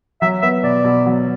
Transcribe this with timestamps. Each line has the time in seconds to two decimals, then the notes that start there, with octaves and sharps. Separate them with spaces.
0.22 F#3 E5
0.42 B3 E5
0.63 B2 D5
0.84 B2
1.06 F#3